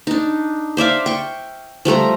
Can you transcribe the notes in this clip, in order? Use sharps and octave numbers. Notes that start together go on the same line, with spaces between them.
D4 D#4
C5 D5 E5 F5
G5 C#6
F3 G3 A3 A#5